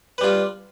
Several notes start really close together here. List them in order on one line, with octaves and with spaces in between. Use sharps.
B4 G3 F4